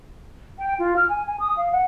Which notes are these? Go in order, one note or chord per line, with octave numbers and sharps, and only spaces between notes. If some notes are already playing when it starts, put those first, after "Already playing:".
G5
F4
F6
G#5
G#5
D#6
F5
F#5